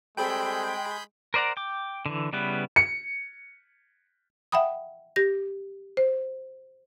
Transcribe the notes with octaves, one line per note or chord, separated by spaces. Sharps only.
G3 G#3 C4 G#4 A4 G5 B5 G6
A#4 C5 D5 F#5 A#5
G5 D6
D3 E3
C#3 G3 B3 E4 B4
C#7
E5 F#5 G5 B5 D#6
G4 A#6
C5